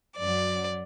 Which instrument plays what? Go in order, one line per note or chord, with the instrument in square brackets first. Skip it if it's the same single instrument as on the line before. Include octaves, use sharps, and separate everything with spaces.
[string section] F#2 F#3 [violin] D5